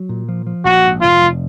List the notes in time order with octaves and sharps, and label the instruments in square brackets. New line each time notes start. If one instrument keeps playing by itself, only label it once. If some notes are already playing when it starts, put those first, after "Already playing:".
Already playing: [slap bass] F#3
A#2
F3
F3
[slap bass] A#1 [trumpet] F#4
[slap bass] G#2
[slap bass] F1 [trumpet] F4
[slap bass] F1